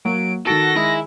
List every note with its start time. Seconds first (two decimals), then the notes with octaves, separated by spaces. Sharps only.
0.05 F#3 A#3 D7
0.47 D#3 F#4 A4 A#6 D7
0.76 G#3 E4